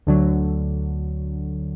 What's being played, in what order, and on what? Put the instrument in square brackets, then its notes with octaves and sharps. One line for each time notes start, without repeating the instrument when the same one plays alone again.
[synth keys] D2 D3 F#3